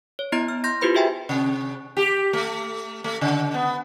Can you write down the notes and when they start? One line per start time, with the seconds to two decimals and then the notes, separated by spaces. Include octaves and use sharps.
0.19 C#5
0.32 B3 E4 D#5 A#5 A6
0.48 F6
0.64 C6 G6 A#6
0.81 E4 F4 G4 B4 C5 B5
0.95 F#4 G#4 E5 G5 G#5
1.29 C3
1.97 G4
2.33 A3
3.04 A3
3.21 C#3
3.54 B3